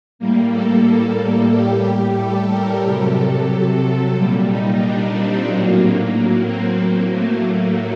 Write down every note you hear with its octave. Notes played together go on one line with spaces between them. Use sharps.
A2 G3 A#3
A4
A2 G3 G4
A4
A#4
C3 F#3 A4
A4
A#2 G3
D#4
D4
C4
A2 F#3 A#3
A#3
C4
A2 F#3 A#3
A3
A#3